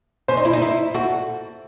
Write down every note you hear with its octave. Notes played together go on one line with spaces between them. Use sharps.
C#4 C5
D#4
E4
D#4
E4
F#4 A4